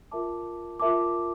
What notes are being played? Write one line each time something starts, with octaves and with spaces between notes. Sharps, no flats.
F4 A#4 E5 A5 D6
F4 A#4 E5 A5 D6